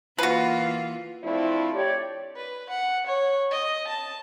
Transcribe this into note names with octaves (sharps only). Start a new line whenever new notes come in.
E3 A#3 F4 F#4 B4
F3 A3 C4 D4 E4
G4 C#5 D5
B4
F#5
C#5
D#5
A5